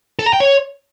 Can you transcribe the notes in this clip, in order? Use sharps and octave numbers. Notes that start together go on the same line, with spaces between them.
A4
A#5
G5
C#5